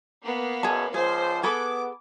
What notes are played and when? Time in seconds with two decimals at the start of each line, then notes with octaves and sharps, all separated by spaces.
0.23 A#3 B3
0.63 F#2 B2 G#4 A5
0.94 C#2 F3 G#4 C5
1.43 B3 G#4 A4 B5 D6